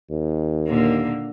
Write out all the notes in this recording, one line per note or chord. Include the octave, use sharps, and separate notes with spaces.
D#2
A#2 D3 A#3